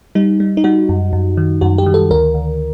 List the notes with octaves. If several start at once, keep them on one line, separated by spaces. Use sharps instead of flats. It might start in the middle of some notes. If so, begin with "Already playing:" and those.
G3 D#4
G3
D#4
G3 F#4
F#2
F#2
D#3
F#2 F#4
G4
D#3
A4
D2 A#4
D2